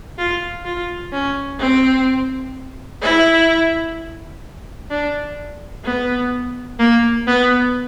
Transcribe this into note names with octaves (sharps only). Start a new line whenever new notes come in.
F4
F4
C#4
C4
E4
D4
B3
A#3
B3